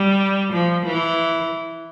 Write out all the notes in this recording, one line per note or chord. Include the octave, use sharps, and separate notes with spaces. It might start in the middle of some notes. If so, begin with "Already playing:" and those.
Already playing: G3
F3
E3